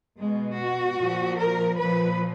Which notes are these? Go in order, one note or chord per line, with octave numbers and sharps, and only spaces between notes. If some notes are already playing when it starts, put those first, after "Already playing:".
B2 G#3
F#4
A#2 F3
A#4
A#2 F3 B4